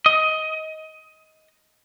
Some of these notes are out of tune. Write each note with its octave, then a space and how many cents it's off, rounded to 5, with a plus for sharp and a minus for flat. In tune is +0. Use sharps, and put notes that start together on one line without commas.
D#5 +15